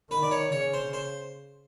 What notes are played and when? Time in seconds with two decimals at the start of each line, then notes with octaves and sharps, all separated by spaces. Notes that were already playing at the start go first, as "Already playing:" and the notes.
0.11 D#3 B4
0.23 D5
0.31 C#5
0.52 C#3 C#5
0.74 C5
0.93 C5